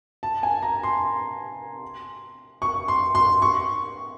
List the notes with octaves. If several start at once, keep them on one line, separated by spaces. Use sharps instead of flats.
A5
G#5
A#5
C6
C#6
C6
C6
C#6